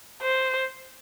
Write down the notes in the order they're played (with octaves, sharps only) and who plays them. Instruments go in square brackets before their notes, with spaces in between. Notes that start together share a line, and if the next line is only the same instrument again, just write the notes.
[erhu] C5